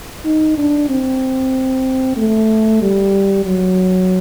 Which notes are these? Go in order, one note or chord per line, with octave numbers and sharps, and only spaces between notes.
D#4
D4
C4
A3
G3
F#3